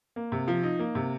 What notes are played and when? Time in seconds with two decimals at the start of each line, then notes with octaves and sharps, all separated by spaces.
0.16 A#3
0.32 C3
0.48 F3
0.63 D#4
0.79 A#3
0.95 C3